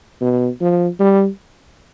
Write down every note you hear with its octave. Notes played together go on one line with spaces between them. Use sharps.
B2
F3
G3